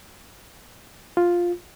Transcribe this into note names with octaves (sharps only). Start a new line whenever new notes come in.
F4